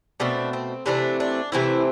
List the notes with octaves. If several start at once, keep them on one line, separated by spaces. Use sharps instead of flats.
B2 A3 C4 D4
C4
C3 E3 A3 C4 D4
D4
C3 E3 A3 C4 E4